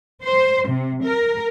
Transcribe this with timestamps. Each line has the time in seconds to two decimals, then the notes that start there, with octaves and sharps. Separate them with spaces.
0.24 C5
0.69 C3
1.04 A#4